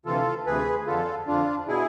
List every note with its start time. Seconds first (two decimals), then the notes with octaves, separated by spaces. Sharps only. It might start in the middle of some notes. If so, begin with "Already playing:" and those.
0.06 D2 C3 E3 F4 A4
0.46 D2 C3 E3 G#4 B4
0.87 F2 D3 F4 A4
1.27 F2 D3 D4 F4
1.68 B2 E4 G#4